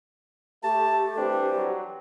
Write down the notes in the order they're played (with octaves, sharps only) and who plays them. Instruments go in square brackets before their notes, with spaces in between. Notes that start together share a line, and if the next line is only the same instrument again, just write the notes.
[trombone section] A3 [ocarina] G4 [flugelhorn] A5
[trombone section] E3 G3 C4 [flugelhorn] D4
[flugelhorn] F#3